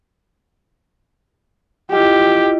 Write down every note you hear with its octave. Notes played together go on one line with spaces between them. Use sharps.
E4 F4 G4 D#5